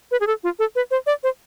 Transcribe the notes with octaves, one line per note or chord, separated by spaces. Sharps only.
B4
G#4
A4
F4
A4
B4
C5
D5
C5